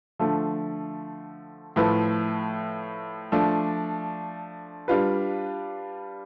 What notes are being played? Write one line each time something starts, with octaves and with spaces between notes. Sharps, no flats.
D3 F3 A3
A2 F3 A3 E4 B4
F3 A3 D4
G3 D4 F4 B4